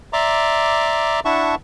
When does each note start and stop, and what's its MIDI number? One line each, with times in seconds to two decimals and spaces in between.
0.13 1.20 74
0.13 1.20 76
0.13 1.20 82
0.13 1.20 84
0.13 1.20 86
1.25 1.55 62
1.25 1.55 64
1.25 1.55 76
1.25 1.55 78
1.25 1.55 81
1.25 1.55 85